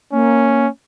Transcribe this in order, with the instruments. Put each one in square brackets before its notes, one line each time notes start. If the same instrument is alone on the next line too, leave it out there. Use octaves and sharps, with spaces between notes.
[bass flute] A#3 [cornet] C#4